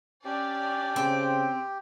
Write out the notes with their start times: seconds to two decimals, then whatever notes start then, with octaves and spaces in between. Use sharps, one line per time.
0.25 C#4 D4 G4 D5
0.96 C#3 C4